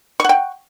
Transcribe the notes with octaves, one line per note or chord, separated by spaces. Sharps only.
F#5 G5 C#6